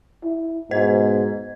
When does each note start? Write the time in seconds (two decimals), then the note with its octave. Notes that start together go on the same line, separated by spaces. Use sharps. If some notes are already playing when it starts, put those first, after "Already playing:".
0.24 E4
0.71 G#2 B2 C5 D#5 G#6